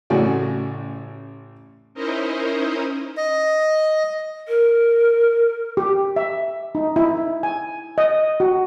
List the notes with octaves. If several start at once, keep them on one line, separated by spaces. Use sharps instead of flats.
A1 A2 C#3 C#4 F#4 D5
C#4 D#4 E4 A#4 C5 D#5
D#5
A#4
G4
E5
D#4
E4
G#5
D#5
F#4